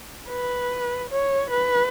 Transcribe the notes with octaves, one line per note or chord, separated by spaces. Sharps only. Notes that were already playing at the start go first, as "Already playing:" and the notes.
B4
C#5
B4